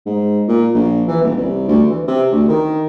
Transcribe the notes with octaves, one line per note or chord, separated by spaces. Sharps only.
G#2
A#2
A#1
E3
D#1
C2
D2
E3
C3
D2
D#3